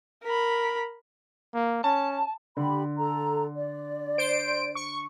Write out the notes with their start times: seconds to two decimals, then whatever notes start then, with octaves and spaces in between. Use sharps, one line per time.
0.24 A#4 B5
1.54 A#3
1.84 C#4 A5
2.57 D3 G4 B5
2.98 A4 A#5
3.55 D5
4.18 C5 D7
4.75 C#6